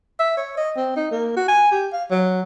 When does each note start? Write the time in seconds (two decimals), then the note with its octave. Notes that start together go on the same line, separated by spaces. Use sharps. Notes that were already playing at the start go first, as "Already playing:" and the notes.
0.19 E5
0.37 C#5
0.57 D#5
0.76 C4
0.96 D#4
1.11 A#3
1.37 F#4
1.48 G#5
1.71 G4
1.93 F5
2.11 F#3